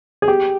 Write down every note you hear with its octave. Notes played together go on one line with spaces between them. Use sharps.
G#4
G4